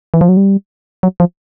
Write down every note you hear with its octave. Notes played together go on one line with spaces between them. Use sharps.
E3
F3
F#3
G3
F#3
F3